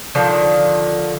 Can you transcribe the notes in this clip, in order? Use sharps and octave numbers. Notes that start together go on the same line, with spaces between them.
D3 D#3 F3